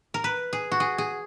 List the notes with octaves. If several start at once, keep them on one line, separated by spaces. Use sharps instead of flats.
A#4
B4
G#4
F#4
G#4
G#4